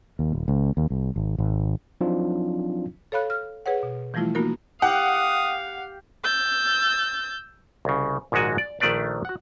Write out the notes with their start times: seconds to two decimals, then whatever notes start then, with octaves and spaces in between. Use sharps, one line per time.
0.19 D#2
0.33 D#1
0.48 C#2
0.77 D#2
0.90 C2
1.16 G#1
1.39 G#1
2.01 F3 F#3 C4 D4 D#4 F4
3.12 A4 C#5 F5 B5 F#6
3.30 F6
3.66 G#4 B4 C#5 F#5
3.83 B2
4.14 E3 F3 G3 A3 E4 F4
4.35 A#3 B3 D#4 F4 F#4 A#4
4.82 G4 F5 F#5 D#6
6.23 E6 G6 A6
7.85 C2 C#3
8.32 A#1 G#2 D#3 G#3 F#4 G#5
8.58 D5
8.80 A#1 D#3 A3 D4 B4 D5
9.25 F#4 F#5